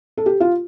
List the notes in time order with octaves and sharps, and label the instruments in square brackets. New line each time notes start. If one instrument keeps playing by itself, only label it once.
[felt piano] A4
G4
F4